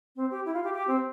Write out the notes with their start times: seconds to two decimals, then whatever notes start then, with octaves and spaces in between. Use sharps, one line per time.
0.16 C4
0.31 G4
0.45 E4
0.54 F4
0.64 G4
0.74 G4
0.87 C4